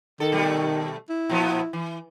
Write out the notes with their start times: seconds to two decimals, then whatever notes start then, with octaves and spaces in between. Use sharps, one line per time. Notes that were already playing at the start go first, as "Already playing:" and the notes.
0.20 D#3 A4
0.32 B2 G3 A3
1.09 E4
1.29 A#2 F3 B3
1.73 E3